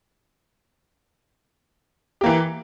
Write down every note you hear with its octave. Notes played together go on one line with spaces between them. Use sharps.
E3 A#3 G4